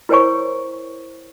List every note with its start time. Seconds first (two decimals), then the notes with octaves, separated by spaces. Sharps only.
0.09 E4 A#4 C5 C#5 G#5 C#6